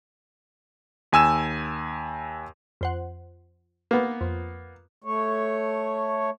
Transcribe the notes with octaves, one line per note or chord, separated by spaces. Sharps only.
D#2 G#5 E6 E7
F2 C5 F#5
A#3 B3
F2
A3 C#5